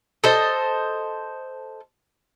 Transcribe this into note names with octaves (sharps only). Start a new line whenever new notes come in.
A4 C5 D#5